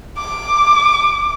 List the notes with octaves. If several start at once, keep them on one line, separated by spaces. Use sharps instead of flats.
D6